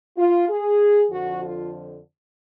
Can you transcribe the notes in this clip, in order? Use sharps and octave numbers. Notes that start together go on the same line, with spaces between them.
F4
G#4
F2 D3 F3 F#4
F4